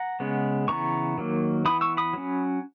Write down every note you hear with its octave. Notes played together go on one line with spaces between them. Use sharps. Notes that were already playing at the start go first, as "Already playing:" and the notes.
Already playing: F#5 A#5
C#3 G#3 B3
C#3 E3 B3 A#5 C#6
D#3 F#3 A#3
E3 B3 B5 D#6
C#6 E6
B5 D#6
F#3 C#4